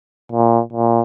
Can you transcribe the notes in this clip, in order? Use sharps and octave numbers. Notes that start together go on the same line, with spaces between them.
A#2
A#2